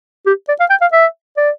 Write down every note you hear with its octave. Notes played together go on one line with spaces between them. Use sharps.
G4
D5
F5
G5
F5
E5
D5